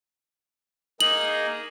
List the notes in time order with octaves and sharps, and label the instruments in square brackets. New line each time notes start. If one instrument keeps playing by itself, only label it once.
[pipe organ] A#3 D#4 G#4 [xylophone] F#7